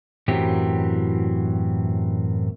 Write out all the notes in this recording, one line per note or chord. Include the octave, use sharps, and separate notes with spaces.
F#2 A2 E3 F#3 C4 G4